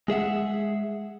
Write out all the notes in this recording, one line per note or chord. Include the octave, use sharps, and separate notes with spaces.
G#3 G#4 E5 F#5